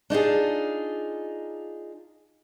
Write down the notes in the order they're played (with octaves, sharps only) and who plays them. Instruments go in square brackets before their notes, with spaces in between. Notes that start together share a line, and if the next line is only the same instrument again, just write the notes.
[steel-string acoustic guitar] D4 D#4 F4 G#4